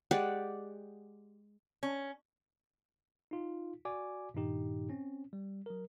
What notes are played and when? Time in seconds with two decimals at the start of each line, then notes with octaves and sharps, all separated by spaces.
0.11 G#3 G4 D5 F#5
1.83 C#4
3.31 D#4 F4
3.85 F#4 D5 G#5 D6
4.34 G2 A#2 D#3 D#4 G4
4.90 C4 C#4
5.33 G3
5.66 F#3 A#4